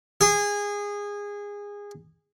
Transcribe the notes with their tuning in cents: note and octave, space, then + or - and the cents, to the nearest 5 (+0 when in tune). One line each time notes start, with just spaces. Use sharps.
G#4 -20